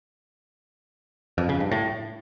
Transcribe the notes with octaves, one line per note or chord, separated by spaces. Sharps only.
F2
C#3
G2
A2